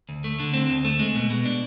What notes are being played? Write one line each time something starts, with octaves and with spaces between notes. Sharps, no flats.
D2
A3
D3
C4
D2
A3
G#3
B2
B2
D4